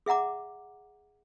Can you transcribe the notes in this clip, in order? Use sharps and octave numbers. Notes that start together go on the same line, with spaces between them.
G#4 E5 F#5 A#5 D6